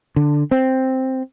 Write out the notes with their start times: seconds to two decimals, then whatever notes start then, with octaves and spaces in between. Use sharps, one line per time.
0.16 D3
0.51 C4